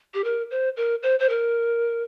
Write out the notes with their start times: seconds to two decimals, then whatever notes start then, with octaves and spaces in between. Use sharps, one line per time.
0.14 G4
0.24 A#4
0.51 C5
0.77 A#4
1.03 C5
1.19 C5
1.29 A#4